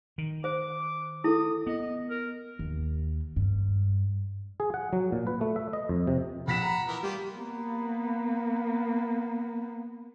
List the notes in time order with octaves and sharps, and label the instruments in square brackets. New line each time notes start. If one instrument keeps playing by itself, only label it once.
[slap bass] D#3
[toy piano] C5 [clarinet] D6
[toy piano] E4 A4 [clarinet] D#6
[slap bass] B3 [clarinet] D#5
[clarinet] A#4
[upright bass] D#2
G2
[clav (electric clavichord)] G#4
F#5
F#3
A#2
B4
A3
E5
D#5
F2
C3
[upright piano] A#1 B6 E7 [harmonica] F#5 B5
[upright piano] A#5
[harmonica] E3 B3 A#4
[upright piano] G3 [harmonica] A#3 F4 G4
[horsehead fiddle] A#3 B3